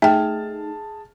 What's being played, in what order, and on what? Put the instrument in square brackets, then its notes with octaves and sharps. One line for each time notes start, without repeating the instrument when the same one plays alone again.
[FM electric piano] A3 D#4 [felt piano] G#4 A5 F6 [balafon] E5 G5